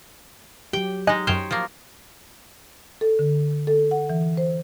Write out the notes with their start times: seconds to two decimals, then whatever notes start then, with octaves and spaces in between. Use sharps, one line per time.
0.73 F#3 G4 G5
1.07 G#3 D#4 D#5 G#5 F#6
1.27 F#2 C5 C#5 G5 F6
1.51 F3 A#3
3.01 A4
3.19 D3
3.67 A4
3.91 F#5
4.10 E3
4.37 C5